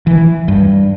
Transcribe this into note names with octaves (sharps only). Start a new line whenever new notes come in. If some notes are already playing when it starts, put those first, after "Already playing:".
E3
G2